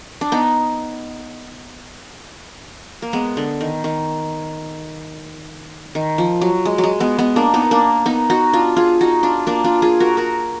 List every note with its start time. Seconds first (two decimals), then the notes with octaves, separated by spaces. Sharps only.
0.21 D4
0.32 B3 D#4
3.02 A#3
3.13 G#3 B3
3.37 D3
3.61 D#3
3.84 D#3
5.95 D#3
6.18 F3
6.41 F#3
6.65 G#3
6.78 F#3
6.84 G#3
7.00 G#3 B3
7.18 G#3 B3
7.36 A#3 D4
7.54 B3 D#4
7.71 A#3 D4
8.06 B3 D#4
8.30 D#4 F#4
8.53 D4 F4
8.77 F4 G#4
9.01 D#4 F#4
9.23 D4 F4
9.47 A#3 D4
9.64 D4 F4
9.82 F4 G#4
10.00 F#4 A#4
10.17 F#4 A#4